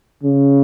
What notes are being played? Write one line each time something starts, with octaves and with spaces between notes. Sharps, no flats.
C#3